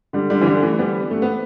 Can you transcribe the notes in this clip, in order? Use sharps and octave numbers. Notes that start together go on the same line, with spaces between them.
D3 G3
D3 G3
E3
D3 G3
E3 A3
G3 B3
A3
B3